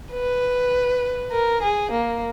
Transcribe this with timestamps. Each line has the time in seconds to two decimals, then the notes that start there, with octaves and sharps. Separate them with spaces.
0.13 B4
1.31 A#4
1.62 G#4
1.91 A#3